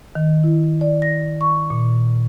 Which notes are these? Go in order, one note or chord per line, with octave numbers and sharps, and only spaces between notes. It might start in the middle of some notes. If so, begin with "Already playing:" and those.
D#3
E4
D5
A#6
C#6
A#2